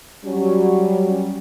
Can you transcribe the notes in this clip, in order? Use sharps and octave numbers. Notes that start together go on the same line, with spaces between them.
F#3 G3 C#4